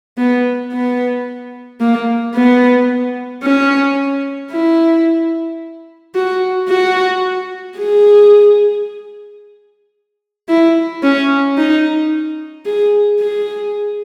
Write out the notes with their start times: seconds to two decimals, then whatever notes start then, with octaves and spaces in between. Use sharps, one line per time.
0.18 B3
0.72 B3
1.80 A#3
2.34 B3
3.43 C#4
4.52 E4
6.15 F#4
6.69 F#4
7.77 G#4
10.48 E4
11.03 C#4
11.58 D#4
12.66 G#4
13.20 G#4